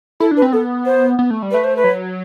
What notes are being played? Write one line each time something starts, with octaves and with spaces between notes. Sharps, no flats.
E4 A4
D4
B4
C4
B3 A4
C5
B3
A3
G3
A3 B4
C5
B4
F#3